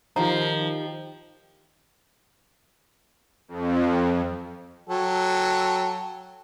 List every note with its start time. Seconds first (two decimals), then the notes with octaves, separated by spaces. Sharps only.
0.16 D#3 F3 D#4 F4 G4 A#5
3.48 F2
4.89 F#3 A4 G5